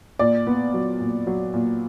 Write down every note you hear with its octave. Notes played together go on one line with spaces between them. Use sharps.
A#2 D5
B3
F#3
A#2
F#3
A#2